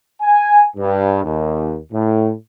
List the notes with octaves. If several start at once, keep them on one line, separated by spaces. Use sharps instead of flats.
G#5
G2
D#2
A2